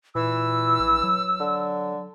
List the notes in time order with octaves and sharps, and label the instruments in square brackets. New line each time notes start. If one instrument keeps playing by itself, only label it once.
[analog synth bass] A#2 [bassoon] E3 [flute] E6
[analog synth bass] A#1
F#3
[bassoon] D3